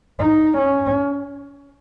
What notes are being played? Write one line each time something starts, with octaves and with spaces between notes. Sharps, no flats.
D#4
C#4